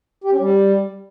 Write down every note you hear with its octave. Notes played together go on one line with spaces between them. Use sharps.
G4
C#4
G3